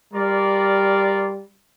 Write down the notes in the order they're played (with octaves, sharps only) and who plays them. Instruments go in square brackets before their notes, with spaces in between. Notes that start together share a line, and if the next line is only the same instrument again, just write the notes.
[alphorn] G3 [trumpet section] F4 A#4 D5